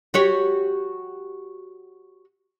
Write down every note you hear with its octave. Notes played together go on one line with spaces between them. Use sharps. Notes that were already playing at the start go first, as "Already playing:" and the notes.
F#4 G4 C#5